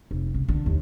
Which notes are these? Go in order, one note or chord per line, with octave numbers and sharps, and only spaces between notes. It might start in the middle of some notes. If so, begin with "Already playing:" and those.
F1
C#3
D3
D#2